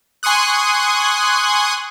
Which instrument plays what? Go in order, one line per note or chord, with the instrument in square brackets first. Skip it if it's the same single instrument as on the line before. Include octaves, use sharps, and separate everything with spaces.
[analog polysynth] G#5 C6 C#6 D#6 F#6